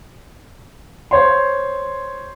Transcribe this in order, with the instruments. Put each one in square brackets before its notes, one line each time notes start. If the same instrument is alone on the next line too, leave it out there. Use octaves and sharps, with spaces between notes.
[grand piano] C5 C#5 C6